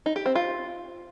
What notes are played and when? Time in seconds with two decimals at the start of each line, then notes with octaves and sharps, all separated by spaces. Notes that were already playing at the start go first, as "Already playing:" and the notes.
0.06 D#4
0.16 G4
0.26 C4
0.35 F4